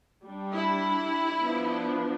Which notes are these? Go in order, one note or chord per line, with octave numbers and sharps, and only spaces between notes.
G3 D4
E4
F3 B3 D4